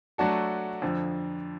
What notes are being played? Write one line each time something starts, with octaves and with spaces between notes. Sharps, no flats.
F#3 A3 D4 F#4 A4
F2 D3 F3